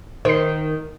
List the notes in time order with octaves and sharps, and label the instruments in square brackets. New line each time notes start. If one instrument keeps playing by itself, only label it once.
[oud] D#3 [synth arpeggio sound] C5 C7